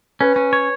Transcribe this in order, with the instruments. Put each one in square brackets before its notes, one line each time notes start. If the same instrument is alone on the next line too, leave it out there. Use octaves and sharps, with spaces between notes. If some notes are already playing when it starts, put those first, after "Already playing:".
[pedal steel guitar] C#4 [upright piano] B4
[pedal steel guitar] C#4
C#5